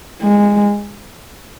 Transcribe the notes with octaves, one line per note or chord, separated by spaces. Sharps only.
G#3